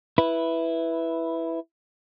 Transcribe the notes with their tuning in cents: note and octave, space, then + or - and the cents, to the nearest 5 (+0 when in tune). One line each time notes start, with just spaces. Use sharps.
E4 +0 B4 +0